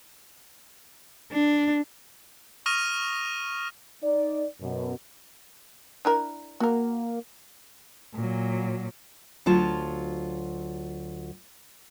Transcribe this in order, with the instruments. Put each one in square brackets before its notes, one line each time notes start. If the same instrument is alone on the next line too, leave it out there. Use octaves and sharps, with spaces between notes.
[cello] D4
[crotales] C#6 D#6 F6 A#6 D#7 F7
[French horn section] D#4 D5
F#2 B2
[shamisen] D4 E4 A#4
[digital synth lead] A#3 [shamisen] F#4 A#4
[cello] A#2 F#3
[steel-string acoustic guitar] D2 F#3 F4 A5